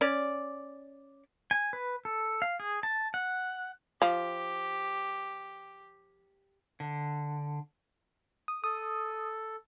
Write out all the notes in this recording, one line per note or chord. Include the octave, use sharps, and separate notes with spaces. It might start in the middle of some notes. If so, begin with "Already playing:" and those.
C#4 D5
G#5
B4
A4
F5
G#4
A5
F#5
F3 G4
D3
D#6
A4 D#6